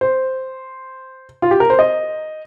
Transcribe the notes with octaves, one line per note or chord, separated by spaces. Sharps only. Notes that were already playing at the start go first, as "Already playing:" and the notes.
C5
F4
G4
A#4
C5
D#5